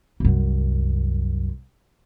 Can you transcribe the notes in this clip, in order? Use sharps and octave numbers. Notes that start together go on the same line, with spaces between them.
C2 F#2